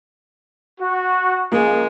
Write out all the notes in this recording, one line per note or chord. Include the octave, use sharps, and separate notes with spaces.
F#4
C#3 F3 G#3 A#3